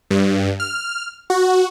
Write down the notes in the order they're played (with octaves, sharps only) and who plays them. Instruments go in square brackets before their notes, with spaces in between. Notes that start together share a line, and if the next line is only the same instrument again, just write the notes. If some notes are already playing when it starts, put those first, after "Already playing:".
[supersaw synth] G2
F6
F#4